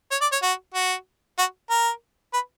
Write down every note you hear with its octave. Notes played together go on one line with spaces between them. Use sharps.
C#5
D5
C#5
F#4
F#4
F#4
A#4
B4